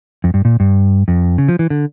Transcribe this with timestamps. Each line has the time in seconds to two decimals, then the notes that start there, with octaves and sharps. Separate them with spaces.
0.24 F2
0.34 G2
0.45 A#2
0.60 G2
1.08 F2
1.38 C#3
1.48 F3
1.59 E3
1.70 D3